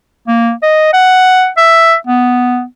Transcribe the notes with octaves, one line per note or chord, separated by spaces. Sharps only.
A#3
D#5
F#5
E5
B3